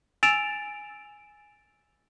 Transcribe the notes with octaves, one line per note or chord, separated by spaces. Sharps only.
G#5 E6 A6 D7 E7 F7